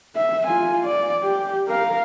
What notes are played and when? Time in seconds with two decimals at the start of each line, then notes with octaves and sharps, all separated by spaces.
0.16 E5
0.47 F4 G#5
0.85 D5
1.23 G4
1.68 A#4 F5